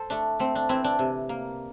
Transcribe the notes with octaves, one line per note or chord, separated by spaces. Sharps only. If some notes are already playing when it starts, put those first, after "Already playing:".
Already playing: A4 C5
A3 D4
A3 C4
D4
E3 C4 E4
D4
C3
A#3